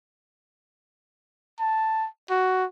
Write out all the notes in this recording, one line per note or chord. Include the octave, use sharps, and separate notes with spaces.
A5
F#4